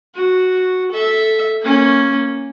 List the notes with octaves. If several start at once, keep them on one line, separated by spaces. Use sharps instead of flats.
F#4
A4 E5
A#3 C#4